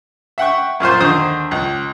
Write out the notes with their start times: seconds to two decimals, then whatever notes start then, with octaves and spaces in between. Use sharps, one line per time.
0.38 E5 F#5 G5 C#6
0.80 F#2 A#2 F4 C5
1.00 D#2 D3 C5 D#6
1.51 C#2